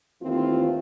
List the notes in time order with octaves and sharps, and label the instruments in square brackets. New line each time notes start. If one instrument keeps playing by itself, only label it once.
[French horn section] D#2 E3 A3 C4 F4